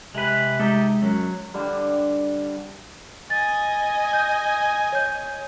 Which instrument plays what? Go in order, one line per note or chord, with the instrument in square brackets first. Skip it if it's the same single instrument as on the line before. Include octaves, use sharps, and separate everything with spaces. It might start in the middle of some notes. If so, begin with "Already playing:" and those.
[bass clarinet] C3 [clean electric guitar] G#3 B4
[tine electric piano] G#3 [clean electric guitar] D#4 G4 A4
[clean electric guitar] F#2 [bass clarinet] F#3
[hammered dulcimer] D3 G3
[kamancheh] D#5 G#5 [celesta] A6
[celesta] G6
C#5 G6